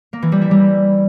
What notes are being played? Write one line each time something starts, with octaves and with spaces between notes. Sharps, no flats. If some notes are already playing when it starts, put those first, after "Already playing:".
A#3
E3
G3
E4
G3